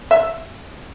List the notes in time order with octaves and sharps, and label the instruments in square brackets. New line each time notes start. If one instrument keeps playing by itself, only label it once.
[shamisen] E5